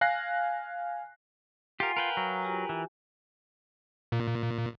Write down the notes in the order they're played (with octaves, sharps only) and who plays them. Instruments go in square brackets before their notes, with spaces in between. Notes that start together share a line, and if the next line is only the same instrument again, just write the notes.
[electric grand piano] F5 G#5 F#6 A#6 C7
[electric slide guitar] F4 [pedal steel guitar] G4 A#4 [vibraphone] F5 F#5 G#5
[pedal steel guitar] A#4 B4 G5
[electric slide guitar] F#3
[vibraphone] F4 G4 G#5
[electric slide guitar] E3
[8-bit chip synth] A#2